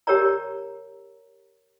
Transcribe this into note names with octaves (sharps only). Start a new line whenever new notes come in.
G4 A#4 C#5 D5 A#5